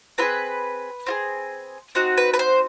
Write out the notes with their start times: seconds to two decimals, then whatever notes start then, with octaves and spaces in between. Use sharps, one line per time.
0.18 C4 F4 G#4 B4
1.06 C4 F4 G#4
1.95 C4 D#4 F#4
2.17 B4
2.33 B4
2.39 C5